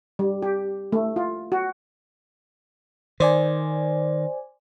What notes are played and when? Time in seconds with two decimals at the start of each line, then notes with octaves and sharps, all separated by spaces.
0.19 G3
0.42 G4
0.92 A3
1.16 F4
1.52 F#4
3.20 D#3 C5 D5 G#5